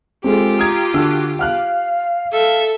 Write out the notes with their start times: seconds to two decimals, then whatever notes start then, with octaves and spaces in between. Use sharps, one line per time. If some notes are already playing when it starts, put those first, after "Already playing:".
0.24 G#3 C4 F4 G4 A4
0.59 A#5 D#6 G#6
0.94 D3 F#4 E6
1.39 F5 F#5 F6 F#6
2.32 A4 E5 F5